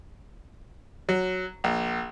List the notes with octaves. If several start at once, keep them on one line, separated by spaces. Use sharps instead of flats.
F#3
A#1